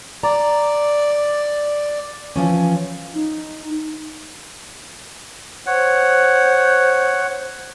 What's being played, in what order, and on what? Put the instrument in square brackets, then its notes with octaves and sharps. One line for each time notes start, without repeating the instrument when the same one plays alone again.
[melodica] D5 [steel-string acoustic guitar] A#5
[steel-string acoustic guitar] E3 F3 C#4
[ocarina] D#4
[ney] C5 [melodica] C#5 F#5